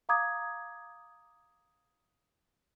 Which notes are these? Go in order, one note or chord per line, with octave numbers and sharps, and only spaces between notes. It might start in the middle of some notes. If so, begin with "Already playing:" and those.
F5 A#5 D6 D#6 G#6